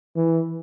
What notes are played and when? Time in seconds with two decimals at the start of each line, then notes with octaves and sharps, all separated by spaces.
0.16 E3